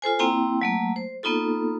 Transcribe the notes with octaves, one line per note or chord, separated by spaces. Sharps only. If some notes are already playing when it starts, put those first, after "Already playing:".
F4 A4 C5 G#5
A#3 C4 E4 G5 A#5
F#3 A3 A#3
C5
A#3 B3 D#4 F4 A4